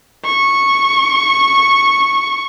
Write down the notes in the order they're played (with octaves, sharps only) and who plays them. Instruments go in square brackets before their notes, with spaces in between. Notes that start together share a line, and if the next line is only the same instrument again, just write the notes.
[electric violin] C#6